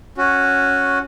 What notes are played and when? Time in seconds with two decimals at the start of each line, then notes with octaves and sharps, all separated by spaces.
0.17 C#4 F#4